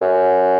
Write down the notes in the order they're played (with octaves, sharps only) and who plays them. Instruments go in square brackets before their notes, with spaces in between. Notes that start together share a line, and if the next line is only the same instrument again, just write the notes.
[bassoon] F#2